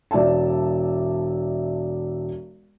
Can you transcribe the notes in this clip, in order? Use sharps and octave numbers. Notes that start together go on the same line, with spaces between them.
E1 D5 E5 A5